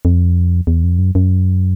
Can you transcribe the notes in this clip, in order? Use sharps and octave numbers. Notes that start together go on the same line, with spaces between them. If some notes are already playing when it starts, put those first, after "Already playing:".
F2
E2
F2
F#2
F#2